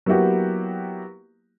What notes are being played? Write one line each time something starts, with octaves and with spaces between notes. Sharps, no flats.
F#3 A#3 B3 E4 F#4 G4